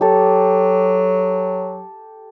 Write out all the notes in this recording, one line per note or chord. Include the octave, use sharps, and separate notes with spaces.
F#3 G4 A4